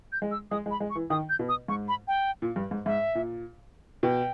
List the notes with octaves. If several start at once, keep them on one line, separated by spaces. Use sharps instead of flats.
G6
G#3
E6
G#3 D#6
G#3
B5
G#3
C#6
E3
D#3 D#6
G6
B2
D#6
G#2 C#6
B5
G5
A#2
G2
G#2
G#2 E5
A#2
B2 G5